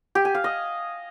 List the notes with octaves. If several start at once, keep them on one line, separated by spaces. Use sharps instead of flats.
G4
G#5
F5
D#5